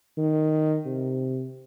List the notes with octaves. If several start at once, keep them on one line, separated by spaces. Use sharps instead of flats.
D#3
C3